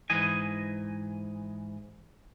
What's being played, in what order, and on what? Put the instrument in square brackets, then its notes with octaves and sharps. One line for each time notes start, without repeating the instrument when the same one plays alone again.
[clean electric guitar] G#2 E3 D#5 G#5